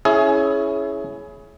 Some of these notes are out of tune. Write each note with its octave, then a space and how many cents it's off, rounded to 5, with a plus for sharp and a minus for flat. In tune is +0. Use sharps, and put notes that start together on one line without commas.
C#4 +0 E4 +0 G#4 +25